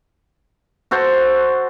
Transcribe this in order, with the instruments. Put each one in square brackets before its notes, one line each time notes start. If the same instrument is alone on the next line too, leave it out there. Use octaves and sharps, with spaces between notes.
[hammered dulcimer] F#4 A4 C5